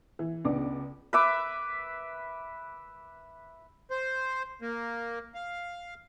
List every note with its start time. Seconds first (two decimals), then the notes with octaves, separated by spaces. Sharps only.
0.19 E3
0.45 C#2 B3 D4 D5 D6
1.13 B4 E5 D6
3.91 C5
4.62 A#3
5.35 F5